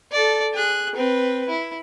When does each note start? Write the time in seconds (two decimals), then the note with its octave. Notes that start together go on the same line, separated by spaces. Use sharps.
0.12 A4 D5
0.53 G#4 F#6
0.95 C4 B4
1.49 E4